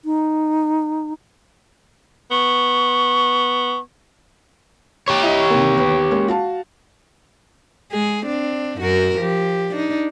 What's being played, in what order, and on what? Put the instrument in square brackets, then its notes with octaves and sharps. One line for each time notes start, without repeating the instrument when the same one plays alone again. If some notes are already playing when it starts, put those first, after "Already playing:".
[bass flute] D#4
[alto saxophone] B3 [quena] C#6
[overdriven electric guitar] G4 C#5
[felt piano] E4 D#5
C3 D#3 A#3
D#2 B3
G#3 A#3 C#4
F#4 F5 A5
[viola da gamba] G#3 G#4
C4 D4
F#2 F#4 A#4
F3 G4
D4 D#4